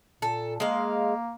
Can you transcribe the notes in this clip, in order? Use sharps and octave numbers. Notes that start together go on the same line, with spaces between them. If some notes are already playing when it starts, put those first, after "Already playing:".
A#2 A4
G#3 A#3 F5